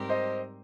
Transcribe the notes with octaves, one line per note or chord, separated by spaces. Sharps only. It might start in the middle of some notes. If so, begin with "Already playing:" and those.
Already playing: G#2 G3 C4 G4 A#4
C5 D#5